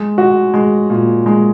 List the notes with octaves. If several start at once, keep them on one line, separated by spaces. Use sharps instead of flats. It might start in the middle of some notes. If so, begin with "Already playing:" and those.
Already playing: G#3
F#4
G#3
A#2
G#3